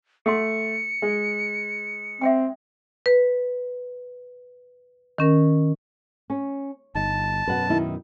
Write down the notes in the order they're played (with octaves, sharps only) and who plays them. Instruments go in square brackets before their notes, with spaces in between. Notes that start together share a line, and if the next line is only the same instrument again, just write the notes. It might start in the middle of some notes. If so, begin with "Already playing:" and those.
[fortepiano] A3 [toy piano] A4 F#5 C6 [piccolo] C#7
[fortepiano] G#3
[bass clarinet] C4 [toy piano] E5 F#5 G5
[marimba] B4
D#3 C#4 A#4
[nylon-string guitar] C#4
[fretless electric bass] G1 [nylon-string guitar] D#4 [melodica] A5
[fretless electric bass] F#2 B2 [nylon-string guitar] B4 F#5
[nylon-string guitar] D#3 D#4 E4